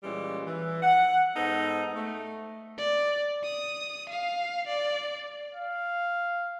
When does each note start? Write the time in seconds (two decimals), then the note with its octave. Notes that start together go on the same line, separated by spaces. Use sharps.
0.03 A#2 E3 G3 G#3 C#4
0.47 E3
0.82 F#5
1.36 G#2 B3 D#4 A4 C5 F#5
1.95 A3
2.78 D5
3.44 D#6
4.09 F5
4.67 D5
5.53 F5